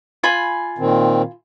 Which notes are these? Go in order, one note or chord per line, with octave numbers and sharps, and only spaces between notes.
F4 G#5 B5
A#2 D#3 C4